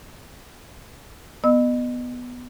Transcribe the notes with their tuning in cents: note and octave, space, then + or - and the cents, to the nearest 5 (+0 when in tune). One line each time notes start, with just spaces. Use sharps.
B3 +0 D#5 -30 E6 -25